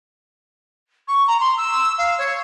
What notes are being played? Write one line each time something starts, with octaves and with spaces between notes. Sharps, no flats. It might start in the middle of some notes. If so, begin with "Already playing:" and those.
C#6
A#5
C6
E6
F5
C#5